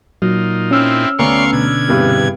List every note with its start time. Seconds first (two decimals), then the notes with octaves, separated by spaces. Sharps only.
0.22 A#2 F#3 D#4 F4
0.71 C4 C#4 E4 E6 F6
1.19 D2 B3 C#5 D5 F5 A#5 C6 C#6
1.53 B2 D3 G#6
1.88 E2 G2 C3